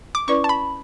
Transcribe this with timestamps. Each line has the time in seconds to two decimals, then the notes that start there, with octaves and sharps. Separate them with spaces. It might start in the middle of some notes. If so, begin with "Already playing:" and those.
0.15 D6
0.28 C#4 E4 B4 D5 C#6
0.44 A5
0.49 B5